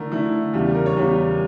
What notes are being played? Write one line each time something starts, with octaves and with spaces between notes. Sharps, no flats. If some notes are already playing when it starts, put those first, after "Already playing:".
Already playing: D3 A3 E4 A#4
D3 A3 E4
E2 C#3 G3
A#4
C#5
E2 C#3 G3